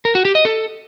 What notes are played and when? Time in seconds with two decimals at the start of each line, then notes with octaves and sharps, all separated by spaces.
0.05 A#4
0.15 F#4
0.25 G4
0.35 D#5
0.45 A4